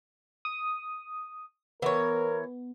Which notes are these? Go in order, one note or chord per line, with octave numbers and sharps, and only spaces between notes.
D#6
E3 B3 A#4 C#5